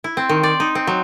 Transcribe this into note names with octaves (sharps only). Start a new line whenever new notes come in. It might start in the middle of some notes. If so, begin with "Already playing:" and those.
E4
C4
D#3
D5
D#4
C4
F#3